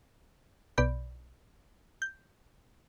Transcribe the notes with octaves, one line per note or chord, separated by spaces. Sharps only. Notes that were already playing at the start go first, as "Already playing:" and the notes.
B1 B2 D5 B5 G6
G6